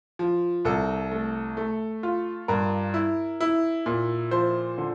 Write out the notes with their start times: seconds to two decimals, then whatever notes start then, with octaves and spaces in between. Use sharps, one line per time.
0.19 F3
0.65 C2 A4
1.12 A3
1.57 A3
2.03 F4
2.48 G2 A#4
2.94 E4
3.40 E4
3.86 A#2
4.31 F3 C5
4.78 D3